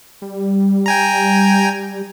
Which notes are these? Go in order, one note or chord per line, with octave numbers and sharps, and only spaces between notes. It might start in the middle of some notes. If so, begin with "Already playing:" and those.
G3
G5 G#5 A#5